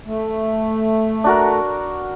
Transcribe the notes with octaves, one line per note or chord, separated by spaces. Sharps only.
A3
D4 F#4 A#4